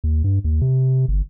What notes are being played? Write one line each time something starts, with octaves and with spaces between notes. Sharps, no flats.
D#2
G2
D#2
C3
G1